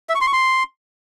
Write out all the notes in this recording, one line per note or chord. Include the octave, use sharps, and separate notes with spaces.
E5
C#6
C6
C#6
C6